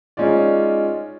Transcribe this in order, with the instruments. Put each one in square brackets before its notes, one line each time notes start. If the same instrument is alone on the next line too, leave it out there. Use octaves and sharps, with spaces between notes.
[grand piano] G#3 C#4 D#4 F4 D5